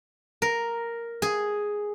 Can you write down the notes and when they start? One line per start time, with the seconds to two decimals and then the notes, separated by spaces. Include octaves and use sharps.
0.42 A#4
1.22 G#4